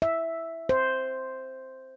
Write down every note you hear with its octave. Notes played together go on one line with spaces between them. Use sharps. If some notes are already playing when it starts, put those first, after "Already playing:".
E5
C5